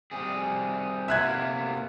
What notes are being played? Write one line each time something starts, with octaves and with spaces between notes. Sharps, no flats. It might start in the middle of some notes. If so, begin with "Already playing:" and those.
G3 C4 G#4
C3 A#3 B3 E5 F#6 G#6